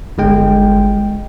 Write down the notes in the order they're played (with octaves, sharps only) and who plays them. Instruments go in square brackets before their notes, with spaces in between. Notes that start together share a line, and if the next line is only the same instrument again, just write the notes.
[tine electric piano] G1 G#3 G5